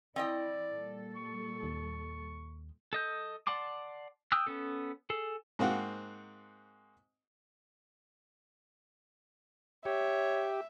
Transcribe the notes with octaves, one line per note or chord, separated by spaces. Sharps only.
E3 C4 E4 D5 D#5 G5
A#2 G3 A4
C#6
D#2
A4 D#5 G6
D5 F#5 A5 C6 D6
G5 D#6 E6 F#6
B3 C#4 A4
G#4 A4
G#2 A#3 C4 F#4 F#5
G4 C#5 E5